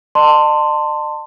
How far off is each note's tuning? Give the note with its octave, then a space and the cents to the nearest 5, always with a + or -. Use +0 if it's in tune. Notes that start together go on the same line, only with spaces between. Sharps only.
D#5 -45 A5 +25 C6 +0